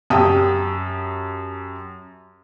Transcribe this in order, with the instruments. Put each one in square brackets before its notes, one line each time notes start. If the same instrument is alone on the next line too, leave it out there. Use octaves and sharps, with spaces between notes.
[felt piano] F#2 G4 G5 A5 D#6 E6